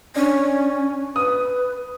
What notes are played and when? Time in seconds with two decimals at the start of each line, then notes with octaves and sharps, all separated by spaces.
0.16 C#4 D4
1.16 B4 D#6